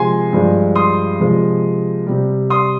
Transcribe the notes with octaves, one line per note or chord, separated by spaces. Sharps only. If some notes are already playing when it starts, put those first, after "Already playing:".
Already playing: C3 F3 G#3 G#5 C6
G2 F3 G#3
C6 D#6
C3 F3 G#3
C3 G3
C6 D#6